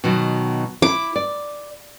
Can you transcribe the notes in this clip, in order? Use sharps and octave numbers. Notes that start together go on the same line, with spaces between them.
B2 D#3 F#3
E4 D6
D5